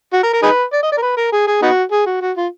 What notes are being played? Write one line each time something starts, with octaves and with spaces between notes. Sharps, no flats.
F#4
A#4
A#4
D#4 G#4 B4
D5
D#5
D5
A#4
B4
A#4
G#4
G#4
B3 D#4 F#4
G#4
F#4
F#4
F4